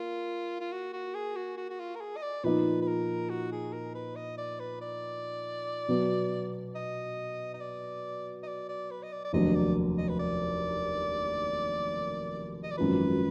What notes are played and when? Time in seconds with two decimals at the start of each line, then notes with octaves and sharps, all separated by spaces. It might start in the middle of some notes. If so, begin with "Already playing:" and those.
Already playing: A#3 F4
0.60 F4
0.72 F#4
0.93 F#4
1.14 G#4
1.36 F#4
1.58 F#4
1.70 F#4
1.80 F4
1.95 A#4
2.01 G#4
2.16 D#5
2.22 D5
2.43 A#2 F3 B3 D#4 B4
2.81 B4
2.87 A#4
3.30 F#4
3.52 G#4
3.73 A#4
3.95 B4
4.16 D#5
4.38 D5
4.60 B4
4.81 D5
5.88 B2 F#3 B3
6.75 D#5
7.54 D#5
7.60 D5
8.43 D#5
8.47 D5
8.69 D5
8.91 B4
9.03 D#5
9.12 D5
9.25 D5
9.33 F1 D#2 D#3 F#3 D4 D#5
9.55 D5
9.98 D#5
10.09 B4
10.19 D5
12.63 D#5
12.71 D5
12.77 G#1 F#2 F3 B4